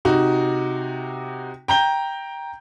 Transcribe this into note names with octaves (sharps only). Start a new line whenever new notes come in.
C3 D#4 F#4
G5 A#5 G6 G7